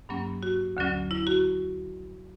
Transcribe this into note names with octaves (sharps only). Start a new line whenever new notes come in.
G2 F#3 A#3 C#4
F#4
D2 D3 F#3 C#4
E4
F#4